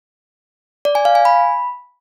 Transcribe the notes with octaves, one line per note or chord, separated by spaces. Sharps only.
D5
G#5
F5
G#5
B5